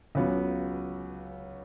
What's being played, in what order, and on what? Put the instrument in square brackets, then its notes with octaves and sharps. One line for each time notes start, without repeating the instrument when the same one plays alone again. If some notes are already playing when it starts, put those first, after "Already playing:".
[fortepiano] C#2 C#3 F#3 B3